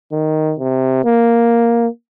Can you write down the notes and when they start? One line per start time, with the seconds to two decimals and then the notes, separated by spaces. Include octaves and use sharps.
0.12 D#3
0.59 C3
1.05 A#3